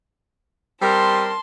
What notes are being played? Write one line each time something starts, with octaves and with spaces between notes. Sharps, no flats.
G3 C4 A#4 A5 C6